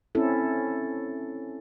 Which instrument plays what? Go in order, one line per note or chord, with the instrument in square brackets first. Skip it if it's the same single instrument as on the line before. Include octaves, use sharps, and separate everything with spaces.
[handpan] C4 C#4 E4 A4